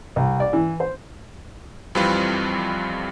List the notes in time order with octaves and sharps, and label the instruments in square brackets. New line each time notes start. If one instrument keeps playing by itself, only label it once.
[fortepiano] C2
D5
E3
C5
[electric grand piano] F2 E3 G3 C4 F4 B4